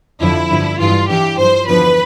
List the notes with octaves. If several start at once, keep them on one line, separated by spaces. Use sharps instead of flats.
F2 D3 F3 E4
G2 D3 F3
G2 E3 F4
G2 E3 G4
G2 F3 C5
E2 D3 F3 B4